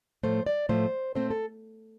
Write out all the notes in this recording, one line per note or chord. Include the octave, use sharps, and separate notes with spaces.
A2 F3 A3 C5
D5
A2 F3 A3 C5
A#2 A3 C4 C5
A4